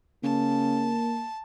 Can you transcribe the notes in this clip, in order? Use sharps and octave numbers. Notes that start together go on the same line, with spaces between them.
C#3 A#3 A5